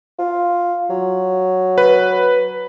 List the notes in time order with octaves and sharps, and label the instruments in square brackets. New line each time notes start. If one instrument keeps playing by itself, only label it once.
[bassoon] F4
F#3
[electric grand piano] B4